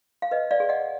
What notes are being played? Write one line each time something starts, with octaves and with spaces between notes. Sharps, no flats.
F5
B4 D#5
D5 F5
G#4
D#5 F#5